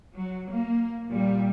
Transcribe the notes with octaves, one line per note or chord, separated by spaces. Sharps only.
F#3
A#3
A#2 G3